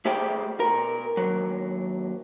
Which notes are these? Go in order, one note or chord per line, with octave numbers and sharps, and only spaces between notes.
A3 G4 G#4 C5 G5
B2 A#4
D#2 F#3